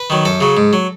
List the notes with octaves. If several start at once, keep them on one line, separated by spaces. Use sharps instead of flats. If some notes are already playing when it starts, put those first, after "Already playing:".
Already playing: B4
D#3 F#3
F#2 A4
C#3 F#3
G#2
F#3